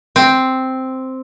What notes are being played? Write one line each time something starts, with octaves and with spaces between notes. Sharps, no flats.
C4